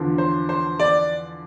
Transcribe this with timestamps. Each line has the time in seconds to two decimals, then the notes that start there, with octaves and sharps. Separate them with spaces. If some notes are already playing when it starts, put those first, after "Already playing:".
Already playing: E2 D3 F3
0.18 C5
0.49 C5
0.80 D5